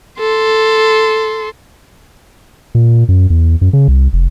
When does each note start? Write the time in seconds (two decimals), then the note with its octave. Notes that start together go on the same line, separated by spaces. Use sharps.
0.19 A4 C6
2.75 A#2
3.09 F#2
3.30 E2
3.61 F#2
3.73 C#3
3.88 C2
4.13 F1